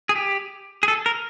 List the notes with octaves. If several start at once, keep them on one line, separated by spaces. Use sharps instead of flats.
G#4
G4
G#4
A4
A#4